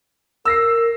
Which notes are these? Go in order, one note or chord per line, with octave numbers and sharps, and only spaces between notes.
A#4 E6 A#6 C7